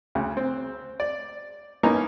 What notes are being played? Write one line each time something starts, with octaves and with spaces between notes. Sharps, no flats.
D2 C#3
C4
D5
A#3 B3 C#4 D#4 A#4